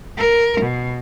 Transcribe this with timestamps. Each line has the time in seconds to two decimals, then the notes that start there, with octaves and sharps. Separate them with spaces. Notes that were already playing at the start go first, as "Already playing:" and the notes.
0.17 A#4
0.62 B2